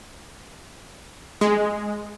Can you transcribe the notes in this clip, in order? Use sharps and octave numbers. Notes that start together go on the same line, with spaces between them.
G#3